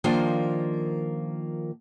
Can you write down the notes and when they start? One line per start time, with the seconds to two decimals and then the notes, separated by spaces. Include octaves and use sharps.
0.04 D#3 F3 A#3 D4 F4 C5